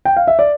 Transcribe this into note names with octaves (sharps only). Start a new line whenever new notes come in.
G5
F5
E5
D5